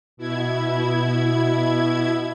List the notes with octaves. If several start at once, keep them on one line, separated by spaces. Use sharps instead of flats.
B2 E4 G#6